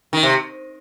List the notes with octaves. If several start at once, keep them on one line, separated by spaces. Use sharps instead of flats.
D#3
C3